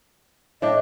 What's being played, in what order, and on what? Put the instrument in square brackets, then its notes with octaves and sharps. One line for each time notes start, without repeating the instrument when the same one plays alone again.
[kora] A2 D4 G5 [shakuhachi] D#5